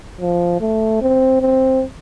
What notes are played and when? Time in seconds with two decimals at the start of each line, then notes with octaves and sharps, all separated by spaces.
0.21 F3
0.61 A3
1.02 C4
1.41 C4